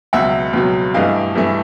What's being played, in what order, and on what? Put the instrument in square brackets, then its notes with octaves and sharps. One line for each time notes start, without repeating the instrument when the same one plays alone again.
[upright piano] C#2 B2 F#3 E5 F#5
C#2 B2 F#3
G2 E3 A3 D#5 F5
G2 E3 A3